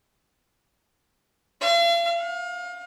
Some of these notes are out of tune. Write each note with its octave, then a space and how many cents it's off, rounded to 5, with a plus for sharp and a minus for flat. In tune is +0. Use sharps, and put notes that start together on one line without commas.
F5 -40
F5 +30